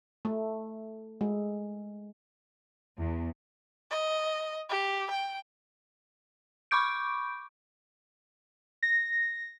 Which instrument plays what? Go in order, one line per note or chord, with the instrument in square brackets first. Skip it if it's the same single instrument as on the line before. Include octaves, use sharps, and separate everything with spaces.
[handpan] A3
G#3
[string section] E2
[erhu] D#5
G4
G5
[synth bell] B5 C#6 D6 G6 D7
[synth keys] A#6